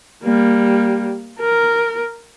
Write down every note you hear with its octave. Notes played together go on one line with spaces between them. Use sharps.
G3 A#3
A#4